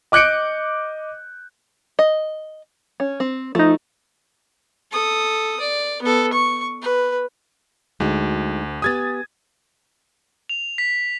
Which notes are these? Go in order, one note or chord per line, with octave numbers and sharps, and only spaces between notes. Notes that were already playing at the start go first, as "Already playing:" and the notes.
D#5 D6 F#6 G6 C#7 D7
D#5
C#4
C4
F3 A3 D#4
A4 D#6
D5
B3 A4
C#6
B4
D2 G#3 D#4 F#4
B3 G4 G#5 D#6 G#6 A6
F7
B6